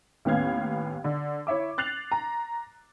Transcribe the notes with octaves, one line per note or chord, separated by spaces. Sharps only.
D#2 A2 B3 C#4 F5 G#6
D3
E4 C#5 E5 D6
F#6 A6 C7 F7 F#7
A#5